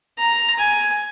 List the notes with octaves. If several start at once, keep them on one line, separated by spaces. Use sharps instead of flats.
A#5
G#5